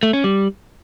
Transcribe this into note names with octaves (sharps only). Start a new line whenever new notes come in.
A3
C#4
G3